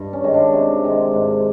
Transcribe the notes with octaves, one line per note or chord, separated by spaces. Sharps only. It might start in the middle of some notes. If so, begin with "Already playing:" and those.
Already playing: G2
C#4
D#3 G#3
D4
C3
D#3 G#3
G#2